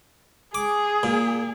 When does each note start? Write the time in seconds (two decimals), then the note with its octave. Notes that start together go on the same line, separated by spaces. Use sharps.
0.55 G#4 D6
1.03 A#2